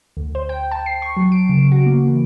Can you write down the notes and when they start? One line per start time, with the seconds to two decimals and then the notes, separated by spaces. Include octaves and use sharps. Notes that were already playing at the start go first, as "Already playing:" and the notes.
0.17 D2
0.35 C5
0.49 G5
0.71 A5
0.86 C7
1.02 C#6
1.17 F#3
1.32 D7
1.49 C#3
1.72 F#4
1.86 A#3
2.07 E3